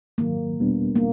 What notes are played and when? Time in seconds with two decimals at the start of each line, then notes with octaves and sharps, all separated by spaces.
0.18 G#2 D#3 F#3 A#3
0.59 E2 B2 G3 B3 D4
0.95 A#3